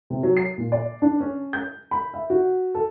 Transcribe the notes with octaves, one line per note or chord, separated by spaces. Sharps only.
C3
F#3
C7
A#2
D5
D4
C#4
G6
B5
E5
F#4
A4